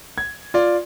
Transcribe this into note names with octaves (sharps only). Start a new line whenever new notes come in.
G#6
F4 D5